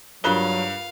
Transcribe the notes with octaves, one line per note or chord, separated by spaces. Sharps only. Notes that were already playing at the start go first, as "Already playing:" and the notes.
G2 F#3 F4 A#4 F5 F#6 G7